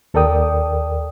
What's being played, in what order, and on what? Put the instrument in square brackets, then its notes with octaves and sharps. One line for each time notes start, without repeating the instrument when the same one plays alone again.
[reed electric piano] D#2 A4 A#4 D5 G5 D#6